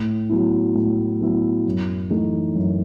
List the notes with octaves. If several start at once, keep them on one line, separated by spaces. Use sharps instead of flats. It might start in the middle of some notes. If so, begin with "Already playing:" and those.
Already playing: A2
F#3 B3 E4
A2
F#3 B3 E4
F#2
E3 A3 D#4
F#2